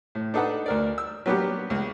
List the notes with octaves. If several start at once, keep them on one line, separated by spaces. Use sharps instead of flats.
A2
D4 D#4 A4 B4 F#5
D2 A#4 D5
E6
F#3 A#3 B3 D4 G4
C#2